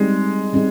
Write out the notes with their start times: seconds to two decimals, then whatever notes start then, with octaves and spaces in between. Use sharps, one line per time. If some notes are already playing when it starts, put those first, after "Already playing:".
Already playing: G3 G#3 C4 D#4 G#4
0.53 G3 C4 D#4 G#4